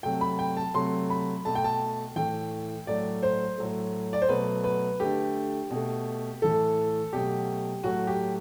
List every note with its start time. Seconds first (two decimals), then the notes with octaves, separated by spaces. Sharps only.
0.03 C3 F#3 A3 G5
0.21 B5
0.39 G5
0.57 A5
0.74 C3 F#3 A3 C6
1.10 B5
1.45 B2 A3 A5
1.55 G5
1.64 A5
2.16 A2 E3 A3 G5
2.87 A2 F#3 A3 D5
3.23 C5
3.58 A2 F#3 A3
4.13 D5
4.22 C5
4.29 B2 F#3 A3 B4
4.64 B4
5.00 D3 A3 G4
5.71 B2
5.76 A3
6.42 A2 E3 A3 A4
7.13 B2 F#3 A3 G4
7.84 A2 F#3 A3 F#4
8.07 G4